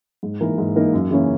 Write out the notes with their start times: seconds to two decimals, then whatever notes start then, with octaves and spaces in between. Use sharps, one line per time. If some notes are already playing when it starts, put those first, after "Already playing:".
0.23 G#2
0.40 E3 A#3 D#4 A#4
0.58 G#2
0.76 E3 A#3 D#4 A#4
0.93 F#2
1.11 C#3 E3 A#3 C#4